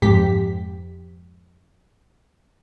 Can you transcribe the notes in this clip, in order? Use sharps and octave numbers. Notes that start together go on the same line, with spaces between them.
F2 G#2 G4 B6